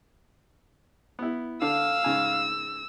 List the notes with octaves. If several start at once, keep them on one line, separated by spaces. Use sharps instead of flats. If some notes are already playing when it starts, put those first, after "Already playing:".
B3 E4
D3 F5 E6
G#2 C#3 G#5